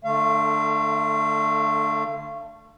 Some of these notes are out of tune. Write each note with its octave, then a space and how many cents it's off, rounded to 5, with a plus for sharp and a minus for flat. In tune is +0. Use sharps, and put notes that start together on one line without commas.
D3 +15 A3 +0 F5 -35